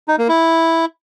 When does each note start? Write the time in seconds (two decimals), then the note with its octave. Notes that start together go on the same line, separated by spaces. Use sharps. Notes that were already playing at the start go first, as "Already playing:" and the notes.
0.08 D#4
0.18 A#3
0.28 E4